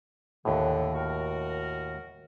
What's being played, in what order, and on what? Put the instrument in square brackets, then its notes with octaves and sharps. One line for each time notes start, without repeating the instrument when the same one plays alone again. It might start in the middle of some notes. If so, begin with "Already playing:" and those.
[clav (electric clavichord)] D#2 A2 [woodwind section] D3 E3
[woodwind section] F#4 A#4